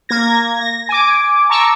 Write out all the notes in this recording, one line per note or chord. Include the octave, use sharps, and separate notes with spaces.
A#3 G#6 A#6
A#6
G#5 D6
A5 A#5 C#6 D6 E6